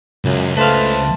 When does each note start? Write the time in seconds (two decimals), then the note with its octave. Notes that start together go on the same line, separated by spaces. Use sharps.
0.25 C#2 F#2
0.57 A3 B4 C5 F5 A5